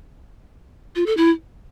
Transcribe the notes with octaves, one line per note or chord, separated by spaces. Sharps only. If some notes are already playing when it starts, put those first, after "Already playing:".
F4
A4
E4